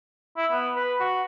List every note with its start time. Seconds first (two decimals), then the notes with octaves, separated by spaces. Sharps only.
0.37 E4
0.52 B3
0.76 B4
1.00 F#4